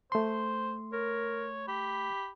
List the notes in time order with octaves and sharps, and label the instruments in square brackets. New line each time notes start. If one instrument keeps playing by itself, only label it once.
[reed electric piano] A3 C6 [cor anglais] C5
[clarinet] A#4 [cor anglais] C#5
[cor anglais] G4 [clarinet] B5